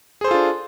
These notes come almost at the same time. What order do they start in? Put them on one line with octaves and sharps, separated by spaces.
G#4 C5 A4 F4 D4